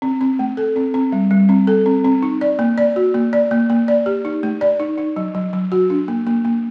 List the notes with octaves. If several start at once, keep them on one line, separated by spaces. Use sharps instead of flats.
C4
C4
A3
A4
C4
C4
G3
G3
C4
A4
C4
C4
D#4
D5
A#3
D5
F#4
A#3
D5
A#3
A#3
D5
G4
D#4
A3
D5
D#4
D#4
F#3
F#3
F#3
F#4
D4
A#3
A#3
A#3